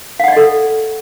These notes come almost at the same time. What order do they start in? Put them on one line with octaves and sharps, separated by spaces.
F5 F#5 D5 D#5 A4